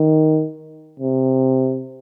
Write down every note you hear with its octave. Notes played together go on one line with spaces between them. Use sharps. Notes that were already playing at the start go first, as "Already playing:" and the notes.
Already playing: D#3
C3